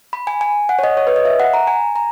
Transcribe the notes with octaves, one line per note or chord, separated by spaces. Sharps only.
B5
G#5
G#5
F#5
C#5
D#5
C#5
B4
D#5
E5
F#5
A#5
G#5
A#5